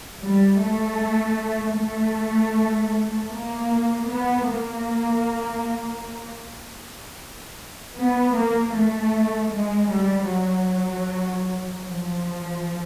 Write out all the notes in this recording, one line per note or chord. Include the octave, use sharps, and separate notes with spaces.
G3
A3
A3
A#3
B3
A#3
B3
A#3
A3
G#3
G3
F#3
F3